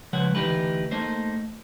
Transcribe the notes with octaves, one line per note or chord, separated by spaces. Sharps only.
C#3 F3 G#3 B4 C#5 F#5
D2 E3 D#4 G4 B4
A3 A#3 D#4 C5